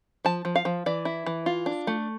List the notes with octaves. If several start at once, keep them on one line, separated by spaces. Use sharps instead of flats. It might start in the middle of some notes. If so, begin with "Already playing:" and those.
F3 A5
F3
F5
F3
E3 D5
E4
E3
F4
D4
A3